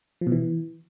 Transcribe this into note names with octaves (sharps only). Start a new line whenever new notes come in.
F3
B2
E3